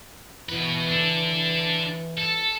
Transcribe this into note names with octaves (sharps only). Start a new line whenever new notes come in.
B2 E3 B4
D4 A4
A4